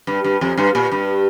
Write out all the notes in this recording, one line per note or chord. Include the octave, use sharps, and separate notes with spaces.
G2
G2
F2
G2
A#2
G2